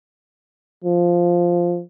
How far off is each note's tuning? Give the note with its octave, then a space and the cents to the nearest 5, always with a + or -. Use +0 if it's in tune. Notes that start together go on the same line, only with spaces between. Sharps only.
F3 +0